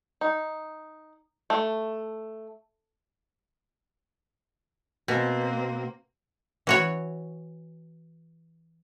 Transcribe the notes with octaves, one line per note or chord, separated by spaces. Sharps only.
D#4
A3
B2 A#3 C4
E3 F#4 C#5